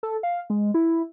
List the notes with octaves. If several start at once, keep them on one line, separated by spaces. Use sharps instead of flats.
A4
F5
G#3
E4